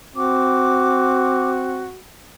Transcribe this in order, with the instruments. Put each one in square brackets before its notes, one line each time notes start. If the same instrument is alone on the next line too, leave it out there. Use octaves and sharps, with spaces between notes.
[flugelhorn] C4 [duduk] F#4 [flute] D6